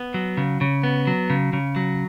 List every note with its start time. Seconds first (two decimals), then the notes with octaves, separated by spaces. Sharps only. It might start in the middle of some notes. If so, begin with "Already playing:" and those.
Already playing: B3
0.14 F#3
0.37 C#3
0.61 C#3
0.83 B3
1.07 F#3
1.30 C#3
1.53 C#3
1.76 F#3